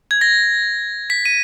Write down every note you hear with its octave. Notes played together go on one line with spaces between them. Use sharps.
G#6
A#6
B6
D#7